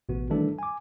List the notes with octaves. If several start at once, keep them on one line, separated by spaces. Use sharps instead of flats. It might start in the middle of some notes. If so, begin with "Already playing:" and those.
A1 B2 B3 F#4
D#3 E3 G3 A3 D4 A4
G#5 D6